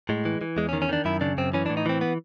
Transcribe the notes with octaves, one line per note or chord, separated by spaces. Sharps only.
A2 G#3
E3
E3
E2 G#3
C#4
D#3
C#4
D#3 D4
F#2 E4
C#3 D4
F#2 C4
E3 C#4
D4
A2
D#4
E3 C4
B3